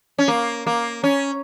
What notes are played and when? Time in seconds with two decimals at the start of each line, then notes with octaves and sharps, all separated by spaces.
0.18 C#4
0.28 A#3
0.67 A#3
1.04 C#4